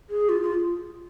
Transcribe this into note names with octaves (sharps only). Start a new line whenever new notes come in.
G#4
F4
F4